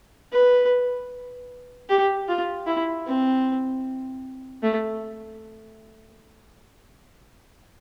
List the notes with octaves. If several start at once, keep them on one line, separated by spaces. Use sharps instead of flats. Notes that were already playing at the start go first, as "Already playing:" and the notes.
B4
G4
F4
E4
C4
A3